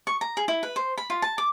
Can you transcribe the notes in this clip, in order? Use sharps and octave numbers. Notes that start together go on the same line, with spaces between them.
C#6
A#5
G#4
E4
B4
C5
B5
F4
A5
D6